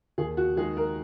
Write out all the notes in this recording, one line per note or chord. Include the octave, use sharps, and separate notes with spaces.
D#2 G#4
F#4
D#3 G#3 G#4
A#4